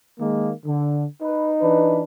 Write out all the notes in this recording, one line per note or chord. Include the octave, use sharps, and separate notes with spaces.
D#3 G#3 A#3
D3
D#4 B4
E3 D4 B4